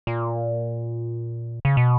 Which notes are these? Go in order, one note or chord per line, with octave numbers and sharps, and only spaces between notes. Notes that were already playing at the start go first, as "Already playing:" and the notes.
A#2
C#3
B2